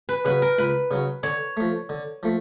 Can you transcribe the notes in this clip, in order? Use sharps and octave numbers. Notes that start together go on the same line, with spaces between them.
B4
C#3 F#3 B4
A#4
C#2 B4
C#3 F#3
D3 C#5
F3 A3
D3
F3 A3